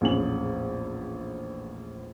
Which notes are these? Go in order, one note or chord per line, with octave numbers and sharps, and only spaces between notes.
A#1 E2 A2 C#4 G#4 F#7